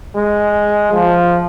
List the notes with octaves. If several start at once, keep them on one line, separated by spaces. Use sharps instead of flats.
G#3
F3